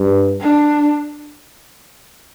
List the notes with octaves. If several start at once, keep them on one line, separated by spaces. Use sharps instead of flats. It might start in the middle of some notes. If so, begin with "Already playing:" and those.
Already playing: G2
D4